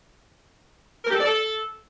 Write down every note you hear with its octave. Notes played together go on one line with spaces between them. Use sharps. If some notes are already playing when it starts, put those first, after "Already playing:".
A#4
G4
A4
D5
A4